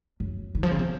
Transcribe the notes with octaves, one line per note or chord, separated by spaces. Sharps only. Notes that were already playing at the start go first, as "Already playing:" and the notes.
F#2
D#3
F3
C#3
C3